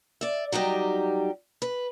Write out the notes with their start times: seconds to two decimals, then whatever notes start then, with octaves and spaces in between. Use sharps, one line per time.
0.21 D5 E5
0.52 F#3 G3 D#4 G4
1.62 B4